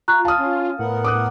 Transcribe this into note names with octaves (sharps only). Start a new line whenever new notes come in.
F4 A#5 C#6 F#6
F5 A5 D#6 F6
C#4
A2 B3 A#4 F#5
D6 D#6 F#6